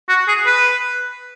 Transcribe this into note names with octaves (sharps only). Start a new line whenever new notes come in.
F#4
G#4
B4